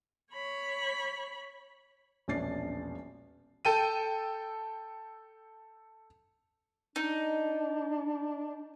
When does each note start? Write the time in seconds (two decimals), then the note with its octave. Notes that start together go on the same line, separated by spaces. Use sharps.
0.33 C#5 B5
2.28 E1 A#1 C#4 D4 A6 C7
3.65 A4 G5 D#7
6.96 D4 D#4